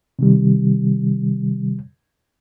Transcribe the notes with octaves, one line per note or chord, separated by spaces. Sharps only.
C3 D#3 G3